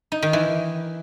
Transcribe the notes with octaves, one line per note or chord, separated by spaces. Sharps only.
D#4
D#3
E3